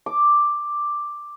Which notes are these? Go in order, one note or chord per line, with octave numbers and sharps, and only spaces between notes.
D6